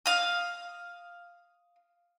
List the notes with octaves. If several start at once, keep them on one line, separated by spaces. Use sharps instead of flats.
F5 D#6